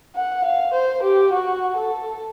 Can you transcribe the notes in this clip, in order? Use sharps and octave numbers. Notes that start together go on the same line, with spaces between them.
F#5
F5
C5
G4
F#4
A4